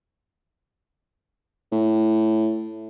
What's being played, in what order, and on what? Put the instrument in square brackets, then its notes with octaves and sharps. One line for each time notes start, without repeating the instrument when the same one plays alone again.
[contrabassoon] A2